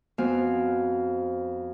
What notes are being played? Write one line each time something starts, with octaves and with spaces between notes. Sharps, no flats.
F2 B3 C4 F#4 F5 G#5